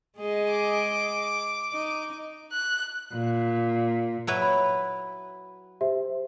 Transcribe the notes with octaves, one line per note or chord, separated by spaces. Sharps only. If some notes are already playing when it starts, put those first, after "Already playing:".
G#3 G#4 D#5
D6
D#4
F#6
A#2
F#3 E4 B4
B5
G4 C5 E5